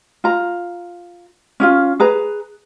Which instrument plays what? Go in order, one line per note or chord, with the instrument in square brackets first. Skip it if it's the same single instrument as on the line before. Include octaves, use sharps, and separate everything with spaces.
[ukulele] F4 A#5
C#4 E4 F4
G#4 B4 A#5